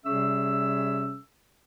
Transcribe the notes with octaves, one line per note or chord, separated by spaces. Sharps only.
C3 G3 C#4 G#4 E5 E6